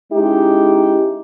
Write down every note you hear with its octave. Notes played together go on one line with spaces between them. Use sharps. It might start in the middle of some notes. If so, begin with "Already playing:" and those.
G#3 C#4 D#4 E4 G4